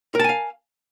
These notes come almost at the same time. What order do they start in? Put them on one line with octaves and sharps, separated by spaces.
A#4 A5 G#5 F5